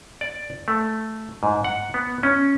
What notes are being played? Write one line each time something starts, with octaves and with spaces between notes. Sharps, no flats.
D5
A3
G#2
F#5
B3
C#4